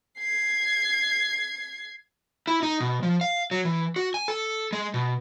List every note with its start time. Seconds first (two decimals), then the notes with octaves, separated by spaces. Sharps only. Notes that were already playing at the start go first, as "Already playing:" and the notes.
0.19 G#6 C7
2.47 E4
2.63 D#4
2.80 B2
3.03 F3
3.21 F5
3.51 F#3
3.65 E3
3.96 F#4
4.14 G#5
4.28 A4
4.72 G#3
4.94 B2